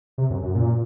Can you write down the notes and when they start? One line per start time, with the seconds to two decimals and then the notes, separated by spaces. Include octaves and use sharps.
0.18 C3
0.30 F#2
0.42 F#2
0.55 A#2